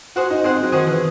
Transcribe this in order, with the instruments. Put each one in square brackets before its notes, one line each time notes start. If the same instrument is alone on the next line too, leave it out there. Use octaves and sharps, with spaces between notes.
[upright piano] F#4 [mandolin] G#4 C5 F#5
[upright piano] D#4
[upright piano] C4 [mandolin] G#4 C5 F#5
[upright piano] F#3
[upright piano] D#3 [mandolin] G#4 C5 F#5
[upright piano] E3